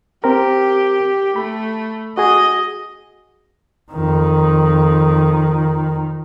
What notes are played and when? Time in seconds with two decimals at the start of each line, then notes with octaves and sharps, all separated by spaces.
0.24 C4 G4 A#4
1.36 A3 B5
2.18 F#4 G#4 D#5
3.92 F2 D#3